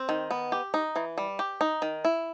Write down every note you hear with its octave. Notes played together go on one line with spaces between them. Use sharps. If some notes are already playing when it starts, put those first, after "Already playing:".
Already playing: C4
D#3
B3
G4
D#4
E3
G3
G4
D#4
D#3
E4